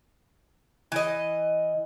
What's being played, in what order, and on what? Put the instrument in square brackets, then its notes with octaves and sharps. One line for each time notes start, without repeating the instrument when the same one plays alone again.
[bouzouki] E3 D#5